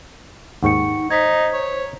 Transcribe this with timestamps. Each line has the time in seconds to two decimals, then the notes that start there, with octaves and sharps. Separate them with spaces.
0.63 D#2 G#2 D#4 F#5 G5 C#6 C#7
1.10 D#4 C5 G#6 B6
1.53 C#5